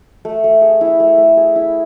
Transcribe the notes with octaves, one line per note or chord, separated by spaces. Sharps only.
A3
A3
G#4
E4
A3
A3
G#4
E4